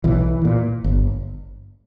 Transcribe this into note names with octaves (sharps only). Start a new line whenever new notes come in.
B1 E3
A#2
G1